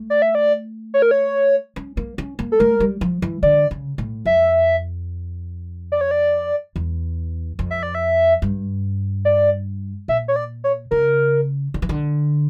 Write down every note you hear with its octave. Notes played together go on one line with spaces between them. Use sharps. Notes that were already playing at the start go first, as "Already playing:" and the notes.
Already playing: A3
D5
E5
D5
C#5
A#4
C#5
C#4
A#3
C#4
A#3
A4
A3 A#4
G3
F3
E3
D3 D5
C#3
A2
F2 E5
D5
C#5
D5
E2
F2
E5
D5
E5
G2
D5
A#2 E5
C#5
D5
C#5
C#3 A#4
D3
E3
D3